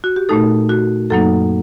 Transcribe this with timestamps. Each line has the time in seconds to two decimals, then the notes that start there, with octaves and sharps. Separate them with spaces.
0.04 F#4
0.16 G4
0.29 A#2 A3 D#4 A4
0.69 F#4
1.10 F#2 F#3 A#3 D#4 A4